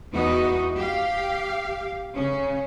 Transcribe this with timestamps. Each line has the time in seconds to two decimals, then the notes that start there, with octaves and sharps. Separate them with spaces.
0.12 E2 B3 D#4 F#4 D#5
0.76 G4 F5
2.15 C#3 C#4